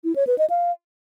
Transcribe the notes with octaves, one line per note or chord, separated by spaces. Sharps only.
E4
C#5
B4
D#5
F5